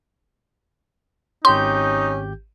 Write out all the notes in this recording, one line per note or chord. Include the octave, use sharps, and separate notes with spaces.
G#1 C#4 D#4 G4 C6 G6